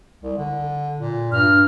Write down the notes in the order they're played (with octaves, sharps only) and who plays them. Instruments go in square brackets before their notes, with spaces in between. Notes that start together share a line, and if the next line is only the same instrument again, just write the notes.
[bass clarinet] C2
D3
A#2
[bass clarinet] G2 [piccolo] F6